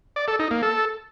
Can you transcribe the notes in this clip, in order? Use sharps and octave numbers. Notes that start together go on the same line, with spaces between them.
D5
A4
D#4
A#3
A4